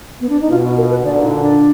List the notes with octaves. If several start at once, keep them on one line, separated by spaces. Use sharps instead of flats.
B3
D4
D#4
B2 F4
A#4
B4
A#2 D3 D5
D#4
D4